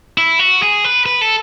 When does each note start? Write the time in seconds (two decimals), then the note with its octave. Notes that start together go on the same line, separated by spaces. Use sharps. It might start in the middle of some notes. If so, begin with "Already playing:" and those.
0.18 E4
0.39 F#4
0.62 G#4
0.84 B4
1.06 B4
1.21 A4